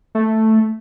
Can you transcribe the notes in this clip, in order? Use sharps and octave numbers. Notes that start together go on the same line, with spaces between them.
A3